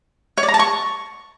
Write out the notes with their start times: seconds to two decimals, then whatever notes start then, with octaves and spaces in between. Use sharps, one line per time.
0.37 C#5
0.43 D5
0.48 A#5
0.54 A5
0.59 C#6